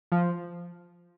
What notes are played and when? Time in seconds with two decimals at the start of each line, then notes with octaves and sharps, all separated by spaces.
0.12 F3